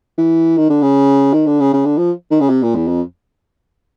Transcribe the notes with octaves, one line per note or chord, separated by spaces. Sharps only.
E3
D#3
D3
C#3
D#3
D3
C#3
C#3
D3
F3
D#3
C#3
C3
A#2
E2
F2